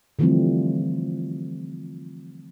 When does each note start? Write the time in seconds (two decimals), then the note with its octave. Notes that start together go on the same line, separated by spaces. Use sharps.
0.19 D3 E3 F3 G3 A3 C4